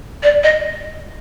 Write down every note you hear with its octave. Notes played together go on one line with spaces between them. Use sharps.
D5
D#5